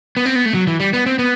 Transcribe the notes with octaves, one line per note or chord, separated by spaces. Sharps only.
B3
C4
B3
A3
F#3
E3
G3
B3
C4
B3